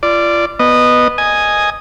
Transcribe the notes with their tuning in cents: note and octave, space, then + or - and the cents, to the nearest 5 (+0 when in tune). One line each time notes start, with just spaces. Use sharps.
F4 -30 D5 +0
B3 +0 D#5 -15
D#5 +0 G#5 +0 D#6 +0